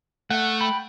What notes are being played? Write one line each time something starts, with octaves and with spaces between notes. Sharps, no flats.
A3 F#5
G5 B5